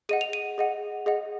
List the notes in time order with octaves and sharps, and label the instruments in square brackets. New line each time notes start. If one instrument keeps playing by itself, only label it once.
[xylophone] G#4 D#5 F#5 D#7
F7
D#7
G#4 D#5 F#5
G#4 D#5 F#5